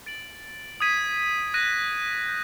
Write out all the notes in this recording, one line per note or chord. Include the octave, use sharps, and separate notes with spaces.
A6 D7 F#7
D#6 G#6 B6 D#7
F#6 A#6 D#7
G6